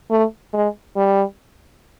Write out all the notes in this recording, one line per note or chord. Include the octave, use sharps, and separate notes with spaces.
A3
G#3
G3